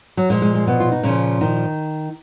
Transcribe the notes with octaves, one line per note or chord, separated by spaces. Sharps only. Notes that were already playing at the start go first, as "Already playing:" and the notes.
F#3
A#2 F3 G#3
G#3
G#3
B2 B3
F4
D#4
A#2 C#3 F3 C#4
D#3 D#4